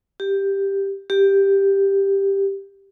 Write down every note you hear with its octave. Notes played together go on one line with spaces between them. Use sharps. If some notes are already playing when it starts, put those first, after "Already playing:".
G4
G4